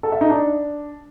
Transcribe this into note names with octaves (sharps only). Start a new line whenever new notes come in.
A4
E5
D#4
D4